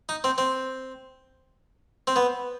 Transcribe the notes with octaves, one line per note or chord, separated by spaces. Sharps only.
D#4
C4
C4
C4
B3